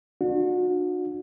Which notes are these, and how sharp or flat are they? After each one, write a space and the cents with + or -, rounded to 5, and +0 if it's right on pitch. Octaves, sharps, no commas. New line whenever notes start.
D4 +30 F#4 -35